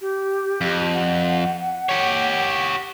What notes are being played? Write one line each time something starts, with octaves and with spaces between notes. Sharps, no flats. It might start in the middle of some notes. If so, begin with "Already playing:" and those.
G4
F2
F#5
G4 C#5